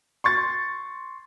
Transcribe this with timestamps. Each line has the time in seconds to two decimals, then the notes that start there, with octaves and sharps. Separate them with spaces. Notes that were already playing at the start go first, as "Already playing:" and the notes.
0.24 C6 C#6 A6